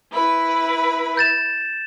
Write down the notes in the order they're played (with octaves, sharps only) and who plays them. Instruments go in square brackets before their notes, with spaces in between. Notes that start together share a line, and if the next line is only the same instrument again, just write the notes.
[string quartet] E4 B4 B5
[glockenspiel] G6 A6 E7